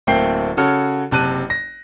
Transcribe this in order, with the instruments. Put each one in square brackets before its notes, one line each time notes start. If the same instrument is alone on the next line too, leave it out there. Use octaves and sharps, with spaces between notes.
[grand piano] D1 A3 A#3 C4 G5 C7
C#3 F#4 A4 C#5 F6
F#1 C3 A5 F#6 D#7
A#6